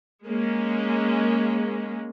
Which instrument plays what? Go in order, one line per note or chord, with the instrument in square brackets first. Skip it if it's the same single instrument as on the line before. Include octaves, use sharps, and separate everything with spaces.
[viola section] G#3 A#3 C#4